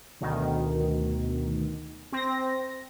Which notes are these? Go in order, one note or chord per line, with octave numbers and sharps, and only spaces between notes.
D2 B2 D#3
C4 A#6